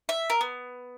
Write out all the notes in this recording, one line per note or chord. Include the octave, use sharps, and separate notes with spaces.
E5
A#4
B3